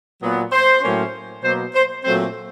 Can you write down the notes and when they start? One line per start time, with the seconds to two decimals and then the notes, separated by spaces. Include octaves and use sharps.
0.20 A#2 F#3 B3
0.52 C5
0.82 A2 F#3 A#3 C#4
1.43 B2 F#3 A#3 C5
1.74 C5
2.03 A#2 F#3 A3 C4 C5